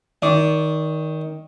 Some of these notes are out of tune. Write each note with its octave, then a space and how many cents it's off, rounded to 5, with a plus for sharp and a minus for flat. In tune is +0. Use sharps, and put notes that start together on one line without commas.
D#3 +15 D5 -25